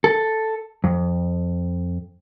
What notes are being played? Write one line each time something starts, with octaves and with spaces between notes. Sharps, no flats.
A4
F2